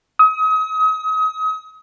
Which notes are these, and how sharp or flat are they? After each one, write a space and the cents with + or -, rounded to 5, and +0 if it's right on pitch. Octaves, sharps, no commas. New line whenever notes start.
D#6 +35